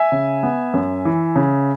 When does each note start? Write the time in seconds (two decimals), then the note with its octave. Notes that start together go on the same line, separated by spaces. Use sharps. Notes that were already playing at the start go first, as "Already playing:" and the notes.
Already playing: E5 G#5
0.12 C#3
0.43 B3
0.74 F#2
1.05 E3
1.36 C#3